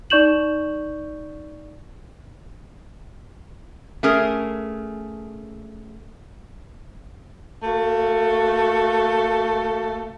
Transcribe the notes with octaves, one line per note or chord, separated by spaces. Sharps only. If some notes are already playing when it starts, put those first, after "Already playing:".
D#4 D5 C#6 G6 E7 F#7
A3 C#4 G#4 A#4
A3 A#3 F#4